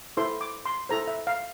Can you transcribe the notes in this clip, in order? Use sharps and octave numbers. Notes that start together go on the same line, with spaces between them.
E4 A4 C5 C6
D6
C6
E4 A4 C5 A#5
E5
F5